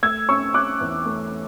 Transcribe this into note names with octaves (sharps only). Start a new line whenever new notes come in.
A3 E6 G#6
C#4 C#6 E6
C#4 D6 F#6
E2
A3